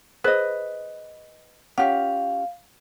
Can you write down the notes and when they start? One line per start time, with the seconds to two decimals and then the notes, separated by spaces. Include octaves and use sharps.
0.24 G#4 B4 C5 D#5
1.78 C#4 F4 G4 F5 F#5